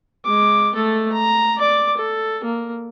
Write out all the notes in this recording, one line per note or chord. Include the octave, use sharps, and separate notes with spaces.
G#3 D6
A3 A4
A#5
D5 D6
A4
A#3